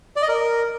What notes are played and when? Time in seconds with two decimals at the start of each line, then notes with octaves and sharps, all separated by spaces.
0.16 D5
0.22 D#5
0.28 A#4